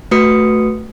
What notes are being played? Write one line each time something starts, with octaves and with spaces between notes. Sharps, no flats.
A3 F#4 B4 D#6 C#7